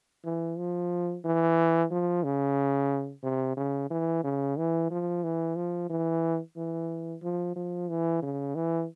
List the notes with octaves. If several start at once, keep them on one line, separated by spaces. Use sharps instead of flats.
E3
F3
E3
F3
C#3
C3
C#3
E3
C#3
E3
F3
E3
F3
E3
E3
F3
F3
E3
C#3
E3